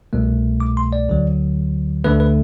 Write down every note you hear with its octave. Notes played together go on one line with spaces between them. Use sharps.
C2 B2 A3
D6
C6
D5
D2 D3 F#3
D2 D3 A3 B4
B4